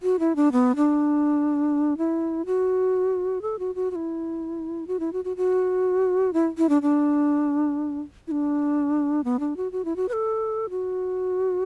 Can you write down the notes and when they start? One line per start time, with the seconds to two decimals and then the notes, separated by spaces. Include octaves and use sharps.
0.03 F#4
0.19 E4
0.36 D4
0.52 B3
0.76 D4
1.98 E4
2.46 F#4
3.42 A4
3.59 F#4
3.75 F#4
3.91 F#4
3.96 E4
4.87 F#4
5.00 E4
5.13 F#4
5.25 F#4
5.37 F#4
6.33 E4
6.58 E4
6.69 D4
6.82 D4
8.27 E4
8.31 D4
9.24 B3
9.40 D4
9.57 F#4
9.72 F#4
9.85 E4
9.96 F#4
10.09 B4
10.13 A4
10.70 F#4